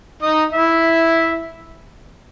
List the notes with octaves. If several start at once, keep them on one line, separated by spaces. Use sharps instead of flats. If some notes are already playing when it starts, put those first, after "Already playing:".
D#4 D#5
E4 E5